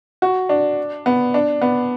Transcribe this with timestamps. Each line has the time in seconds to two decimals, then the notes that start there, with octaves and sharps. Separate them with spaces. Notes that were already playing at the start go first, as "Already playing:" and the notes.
0.22 F#4
0.49 D4
1.06 B3
1.34 D4
1.61 B3